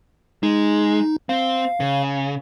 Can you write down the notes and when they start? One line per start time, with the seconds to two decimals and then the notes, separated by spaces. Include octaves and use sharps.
0.43 G#3 D#4
1.29 C4 F5
1.80 C#3